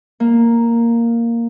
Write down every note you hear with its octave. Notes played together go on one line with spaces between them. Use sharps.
A#3